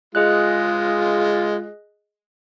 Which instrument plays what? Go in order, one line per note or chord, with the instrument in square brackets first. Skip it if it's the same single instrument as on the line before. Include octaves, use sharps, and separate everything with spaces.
[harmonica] G#3 F4 [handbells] G#4 D#5 F#6